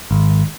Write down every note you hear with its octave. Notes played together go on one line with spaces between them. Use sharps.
G#1